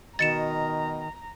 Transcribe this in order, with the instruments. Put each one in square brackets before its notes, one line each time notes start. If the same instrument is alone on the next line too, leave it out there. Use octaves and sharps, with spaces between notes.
[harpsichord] B2 [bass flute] D#3 [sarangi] A#5 [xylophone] A6 C#7 E7